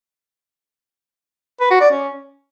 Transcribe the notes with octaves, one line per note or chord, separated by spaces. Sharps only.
B4
F#4
D5
C#4